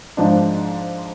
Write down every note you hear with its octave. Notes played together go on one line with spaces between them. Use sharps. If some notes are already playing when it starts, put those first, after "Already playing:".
G#2 F3 G#3 D4